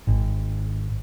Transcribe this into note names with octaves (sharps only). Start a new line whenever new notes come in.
G#1